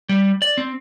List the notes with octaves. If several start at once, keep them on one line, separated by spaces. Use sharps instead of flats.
G3
D5
C4